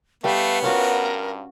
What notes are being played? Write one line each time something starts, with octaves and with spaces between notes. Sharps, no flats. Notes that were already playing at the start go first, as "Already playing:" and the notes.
G3 A3 B3 B4 F5 G5
G2 C#4 F4 F#4 A#4